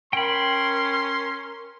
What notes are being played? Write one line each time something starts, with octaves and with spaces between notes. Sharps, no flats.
C#4 A#4 G5 B5 C6